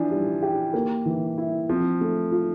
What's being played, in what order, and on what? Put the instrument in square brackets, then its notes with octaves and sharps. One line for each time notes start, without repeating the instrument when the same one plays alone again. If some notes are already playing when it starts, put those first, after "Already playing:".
Already playing: [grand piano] E3 F3 [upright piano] D4
[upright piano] G3
G4
A#3
E3
E4
[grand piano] F3 [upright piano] C4
[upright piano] A3
F4